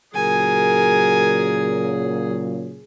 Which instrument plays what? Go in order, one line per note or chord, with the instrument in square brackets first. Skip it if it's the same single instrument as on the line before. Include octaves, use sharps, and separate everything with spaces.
[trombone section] A#2 C#3 F#3 [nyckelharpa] G#4 [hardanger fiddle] A#4 G#5